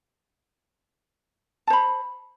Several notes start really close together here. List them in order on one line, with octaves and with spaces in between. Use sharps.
A5 C5 B5